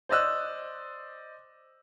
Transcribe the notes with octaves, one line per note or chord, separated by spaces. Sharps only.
C5 D5 D#5 E6 F#6